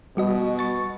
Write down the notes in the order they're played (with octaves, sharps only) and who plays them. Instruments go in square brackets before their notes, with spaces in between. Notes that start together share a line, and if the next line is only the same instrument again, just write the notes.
[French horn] B2 [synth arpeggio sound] G3 F#4 D#5
[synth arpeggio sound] C#6 A6